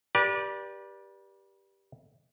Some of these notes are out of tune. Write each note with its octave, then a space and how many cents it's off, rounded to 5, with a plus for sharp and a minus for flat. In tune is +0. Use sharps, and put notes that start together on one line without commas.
G4 +0 B4 -35 D5 +0